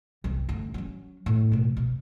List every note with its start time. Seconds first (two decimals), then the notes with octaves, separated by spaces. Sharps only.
0.24 C2 G2
0.49 D2
0.74 F#3 C#4
1.26 A2
1.52 B2 F3
1.77 B2